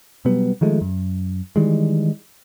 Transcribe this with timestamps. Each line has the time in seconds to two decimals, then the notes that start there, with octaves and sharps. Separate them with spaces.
0.25 B2 F#3 G3 B3
0.61 D#3 F3 G#3 A3
0.81 F#2
1.56 D#3 E3 G3 G#3